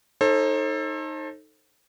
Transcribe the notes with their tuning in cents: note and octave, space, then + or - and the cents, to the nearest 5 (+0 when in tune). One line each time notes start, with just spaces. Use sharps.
D#4 +0 A4 +5 C5 +40